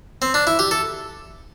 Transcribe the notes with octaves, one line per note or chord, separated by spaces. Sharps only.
C4
D4
E4
G4
A4